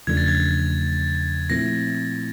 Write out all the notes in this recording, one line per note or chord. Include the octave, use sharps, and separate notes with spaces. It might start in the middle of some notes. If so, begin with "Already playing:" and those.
E2 C#3 F3 A3 D4 G#6
A6
G#6
A#2 F3 A3 C4 E4 A#6